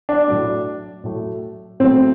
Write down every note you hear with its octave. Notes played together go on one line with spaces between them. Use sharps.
D4
A2 F#3 A3
A2 F#3 A3
A2 F#3 A3 C4